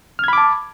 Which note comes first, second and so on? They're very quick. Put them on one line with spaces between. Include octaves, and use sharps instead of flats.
F6 G#6 B5 D6 A5